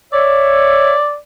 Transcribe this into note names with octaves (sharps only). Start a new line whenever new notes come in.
C#5 D5 E5